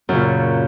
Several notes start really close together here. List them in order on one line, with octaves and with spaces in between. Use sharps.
F#2 C#3 A#2